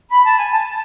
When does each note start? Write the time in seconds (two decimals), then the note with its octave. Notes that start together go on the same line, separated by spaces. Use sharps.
0.10 B5
0.25 A5
0.37 G#5
0.51 A5